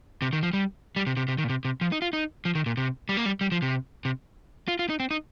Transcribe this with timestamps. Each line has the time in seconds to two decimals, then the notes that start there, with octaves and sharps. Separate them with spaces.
0.22 C3
0.33 D#3
0.43 F3
0.53 G3
0.96 G3
1.07 C3
1.17 C3
1.28 C3
1.38 D#3
1.44 A#2
1.49 C3
1.65 C3
1.81 F3
1.92 D#4
2.02 F4
2.13 D#4
2.45 F3
2.55 D#3
2.66 A#2
2.77 C3
3.09 G3
3.17 A#3
3.25 G3
3.41 G3
3.52 F3
3.62 C3
4.05 C3
4.68 F4
4.79 F4
4.89 D#4
5.00 C4
5.11 D#4